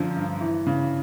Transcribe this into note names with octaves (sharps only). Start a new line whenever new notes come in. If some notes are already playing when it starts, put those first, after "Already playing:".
Already playing: F#2 D3 F3
G2
E3
C#3